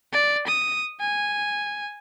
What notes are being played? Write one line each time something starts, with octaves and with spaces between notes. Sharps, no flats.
D5
D#6
G#5